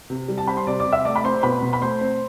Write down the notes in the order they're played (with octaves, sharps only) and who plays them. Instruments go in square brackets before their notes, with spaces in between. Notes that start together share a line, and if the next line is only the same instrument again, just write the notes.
[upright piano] C3
G3
A5
C4 B5
C6
C3 D5 D6
D5 D6
C3
E5 E6
A3 D5 D6
B5
C4 C5 C6
B2 B4 B5
B2
B5
A3 C5 C6
C4